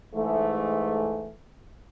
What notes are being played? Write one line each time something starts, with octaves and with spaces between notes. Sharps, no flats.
G#2 E3 G#3 A3